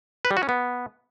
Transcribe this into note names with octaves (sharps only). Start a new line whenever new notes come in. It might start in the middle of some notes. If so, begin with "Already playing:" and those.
B4
G3
F#4
C#4
B3